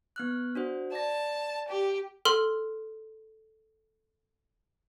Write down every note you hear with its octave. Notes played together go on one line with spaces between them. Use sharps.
B3 F6 F#6
D4 F#4 C5
D5 A5 A#6
G4
A4 C6 F6